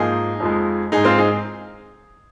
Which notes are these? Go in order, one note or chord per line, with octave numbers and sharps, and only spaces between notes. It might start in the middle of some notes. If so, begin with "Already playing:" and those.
Already playing: G#2 F3 A#3 D#4 G#4
F2 F3 G#3
G#2 G#3 D#4 G#4
C4 F4
D#4 G#4